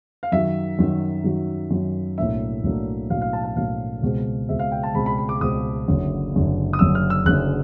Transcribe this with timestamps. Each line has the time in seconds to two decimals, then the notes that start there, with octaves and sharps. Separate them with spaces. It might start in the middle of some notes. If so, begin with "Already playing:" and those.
0.23 F5
0.32 F#2 D#3 F#3 E5
0.79 F#2 D#3 F#3
1.24 F#2 D#3 F#3
1.71 F#2 D#3 F#3
2.18 B1 A2 F#3 A#3 D4 E5
2.64 B1 A2 F#3 A#3 D4
3.10 B1 A2 F#3 A#3 D4 F5
3.22 F5
3.33 A5
3.44 A5
3.56 B1 A2 F#3 A#3 D4 F5
4.02 C#2 B2 G#3 C4
4.48 C#2 B2 G#3 C4 E5
4.59 F5
4.72 G5
4.83 A5
4.94 C#2 B2 G#3 C4 B5
5.06 B5
5.18 B5
5.29 D6
5.41 C#2 B2 G#3 C4 D#6
5.88 F#1 F#2 D3
6.34 F#1 F#2 D3
6.73 D#6
6.79 F#1 F#2 D3 E6
6.95 F6
7.10 E6
7.25 F#1 F#2 D3 F#6